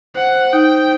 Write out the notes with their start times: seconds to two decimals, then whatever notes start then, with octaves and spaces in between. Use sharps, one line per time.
0.15 C5 F#5
0.53 D#4 G5